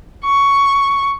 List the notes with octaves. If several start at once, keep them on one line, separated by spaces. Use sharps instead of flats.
C#6